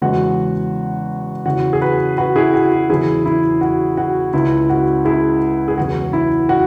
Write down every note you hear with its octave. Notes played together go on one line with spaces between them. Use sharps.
E2 C#3 G#3 F#4
E2 C#3 E3 F#4
G#4
F#4 B4
F#4 B4
E4 G#4
F#4
F#4
E1 E2 C#3 F#3 E4 G#4
E4
F#4
F#4
C#2 C#3 G#3 E4
F#4
E4 G#4
G#4
E1 E2 C#3 F#3 F#4
E4
F#4